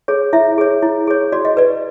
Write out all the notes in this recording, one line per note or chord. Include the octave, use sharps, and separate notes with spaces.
G#4 C#5
E4 E5
G#4 C#5
E4
G#4 C#5
F#4 D5
D#5
B4 D5